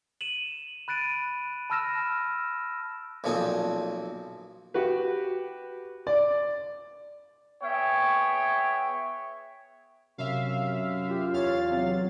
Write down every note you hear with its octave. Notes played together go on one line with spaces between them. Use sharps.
D#7 E7 F#7
B5 F#6 A6 D7 D#7
A5 B5 E6 F6 A#6 E7
B1 A#2 F3 C4 G#5 D#6
F#4 G4 B4
D5
B3 G#4 C#5 E5 G5
F#2 C3 E5 F5
F4 G4
E2 C#5 F5 A6
C3 F#3